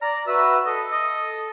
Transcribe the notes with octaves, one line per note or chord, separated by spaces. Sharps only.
D5 A#5
F#4 B4 E5
A4 D#5
D#5